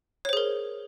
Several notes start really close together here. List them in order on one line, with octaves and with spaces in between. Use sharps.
C#5 C5 G#4 A#4